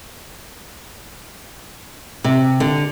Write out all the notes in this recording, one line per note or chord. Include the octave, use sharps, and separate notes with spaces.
C3
D3